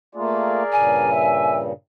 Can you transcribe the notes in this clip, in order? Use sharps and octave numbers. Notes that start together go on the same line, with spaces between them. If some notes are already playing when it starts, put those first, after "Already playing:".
A3 A#3 F4 G#4 A#4 D5
G2 A#2 C#3 G#5
E5